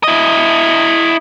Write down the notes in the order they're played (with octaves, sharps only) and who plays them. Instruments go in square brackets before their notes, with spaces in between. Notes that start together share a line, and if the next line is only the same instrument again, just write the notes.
[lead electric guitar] E4 D#5